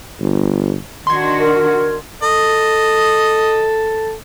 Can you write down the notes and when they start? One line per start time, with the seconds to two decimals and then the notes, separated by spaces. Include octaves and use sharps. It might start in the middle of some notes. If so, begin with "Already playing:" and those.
0.21 G1
1.07 D#3 D4 F#4 C6 G#6
1.40 A#4
2.23 A4 D#5